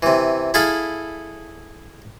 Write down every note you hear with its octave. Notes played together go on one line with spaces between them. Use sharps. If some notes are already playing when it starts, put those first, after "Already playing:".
C3 E3
E4 G#4 A4 F5 B5